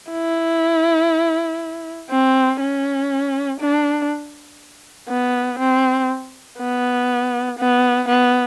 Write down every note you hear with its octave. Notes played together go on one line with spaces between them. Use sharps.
E4
C4
C#4
D4
B3
C4
B3
B3
B3